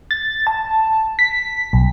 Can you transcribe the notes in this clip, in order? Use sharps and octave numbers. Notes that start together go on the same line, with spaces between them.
A6
A5
B6
B1